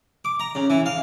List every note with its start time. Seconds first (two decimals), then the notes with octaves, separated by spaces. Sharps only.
0.25 D6
0.40 A#5
0.55 C#3
0.70 E3
0.86 F5